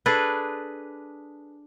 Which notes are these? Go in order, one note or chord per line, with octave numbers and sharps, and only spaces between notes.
D4 G#4 A4 B4